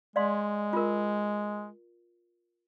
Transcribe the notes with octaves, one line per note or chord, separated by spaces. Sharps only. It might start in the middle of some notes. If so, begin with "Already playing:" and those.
G#3 D5 F5 C6
F4 A#4